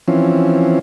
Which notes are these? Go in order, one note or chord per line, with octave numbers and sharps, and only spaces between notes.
E3 F3 C4 C#4